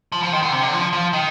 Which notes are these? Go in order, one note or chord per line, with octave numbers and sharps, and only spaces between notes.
F3
F3
D#3
D3
C3
D3
F3
F3
D#3